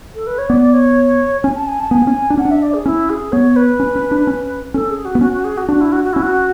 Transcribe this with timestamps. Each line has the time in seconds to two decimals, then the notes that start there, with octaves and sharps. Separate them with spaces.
0.15 A4
0.27 B4
0.38 C#5
0.49 B3 D5
0.73 C#5
1.44 C#4 G#5
1.56 A5
1.68 G#5
1.80 A5
1.91 B3 G#5
2.02 B3
2.07 C#4
2.30 D4
2.37 C#4 F#5
2.45 D4
2.51 E5
2.62 D5
2.74 G#4
2.85 C#4 E4
3.10 G#4
3.32 B3 C#5
3.56 B4
3.80 C#4
3.96 C#4
4.11 D4
4.27 C#4
4.74 C#4 A4
4.90 G#4
5.05 F#4
5.15 B3
5.21 C#4 F#4
5.33 F#4
5.44 G#4
5.57 F#4
5.69 D4 F#4
5.81 E4
5.92 F#4
6.04 F#4
6.13 C#4 E4
6.22 F#4